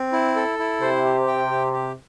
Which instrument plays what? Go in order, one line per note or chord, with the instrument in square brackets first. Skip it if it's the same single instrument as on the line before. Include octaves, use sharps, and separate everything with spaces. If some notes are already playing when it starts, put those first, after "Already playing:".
Already playing: [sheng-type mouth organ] C4
E4
A4
E4
[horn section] C3 [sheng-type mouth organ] C5
[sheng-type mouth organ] G4
G5
G4
G4